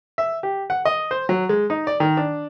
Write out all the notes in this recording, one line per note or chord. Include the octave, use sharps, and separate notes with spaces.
E5
G4
F#5
D#5
C5
F#3
G#3
D#4
D5
D#3
D4